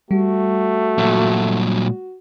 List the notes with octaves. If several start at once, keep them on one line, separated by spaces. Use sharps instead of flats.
G3 A3 F#4
A#2 F#3